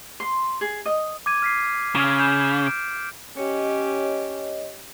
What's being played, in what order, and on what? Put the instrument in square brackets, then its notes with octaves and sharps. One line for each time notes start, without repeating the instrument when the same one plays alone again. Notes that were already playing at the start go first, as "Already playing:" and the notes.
[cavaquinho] C6
G#4
D#5
[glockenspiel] D6 G#6 D#7
F6 B6 C7
[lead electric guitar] C#3 [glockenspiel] F6 D7
[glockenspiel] G6 E7
D7
[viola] C#4 G4 [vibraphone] C#5 D#5